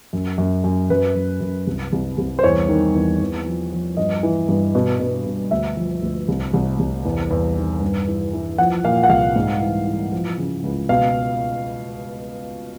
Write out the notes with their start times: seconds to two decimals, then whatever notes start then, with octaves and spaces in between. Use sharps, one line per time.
0.13 F#2
0.38 F#2
0.64 F#2
0.90 F#2 B4
1.15 F#2
1.40 F#2
1.67 C2
1.92 C2
2.18 C2
2.39 C5
2.44 E2 C#5
2.69 D#3
2.95 E2
3.21 E2
3.46 F3
3.72 F3
3.97 G2 D#5
4.23 E3
4.49 G2
4.75 B2
5.00 B2
5.25 B2
5.51 D2 E5
5.77 F3
6.02 D2
6.28 C2
6.54 C2
6.79 C2
7.05 E2
7.31 E2
7.56 D#3
7.81 G2
8.08 E3
8.33 E3
8.58 F3 F#5
8.84 A#2 F5
9.03 F#5
9.09 C2 F5
9.36 G#2
9.61 E3
9.87 E3
10.12 F3
10.38 C#3
10.63 C#2
10.89 B2 F5